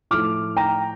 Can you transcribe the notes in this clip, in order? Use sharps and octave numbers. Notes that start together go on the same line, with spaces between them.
A2 F3 A3 D6 F6
G5 A#5